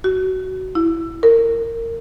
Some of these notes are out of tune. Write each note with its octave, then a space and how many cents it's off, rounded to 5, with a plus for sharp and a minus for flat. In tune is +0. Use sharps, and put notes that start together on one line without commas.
F#4 +20
E4 +5
A#4 -25